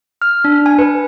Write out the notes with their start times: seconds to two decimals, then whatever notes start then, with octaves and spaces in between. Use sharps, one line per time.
0.22 F6
0.44 D4
0.66 G#5
0.79 B4